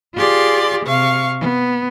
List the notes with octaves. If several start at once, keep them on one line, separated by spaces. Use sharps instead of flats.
F4 G4 G#4 D5 C6
C3 F5 C#6
B3